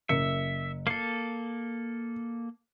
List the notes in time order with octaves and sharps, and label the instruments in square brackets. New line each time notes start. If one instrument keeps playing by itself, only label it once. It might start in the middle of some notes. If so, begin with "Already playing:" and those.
[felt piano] F#1 A#4 C#7 [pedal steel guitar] E5
[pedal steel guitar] A#3 A4 [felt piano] C7